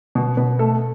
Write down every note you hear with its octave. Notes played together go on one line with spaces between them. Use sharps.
B2
B2 B4
A3 A4